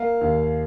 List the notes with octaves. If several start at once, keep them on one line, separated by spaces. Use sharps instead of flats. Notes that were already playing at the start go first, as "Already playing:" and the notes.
Already playing: A#3 F5
D#2